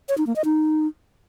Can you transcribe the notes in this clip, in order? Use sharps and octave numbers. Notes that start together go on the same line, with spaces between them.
C#5
D#4
A#3
D#5
D#4